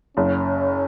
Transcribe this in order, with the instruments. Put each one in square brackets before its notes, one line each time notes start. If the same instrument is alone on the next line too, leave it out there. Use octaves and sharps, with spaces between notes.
[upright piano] F#1 [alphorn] C#4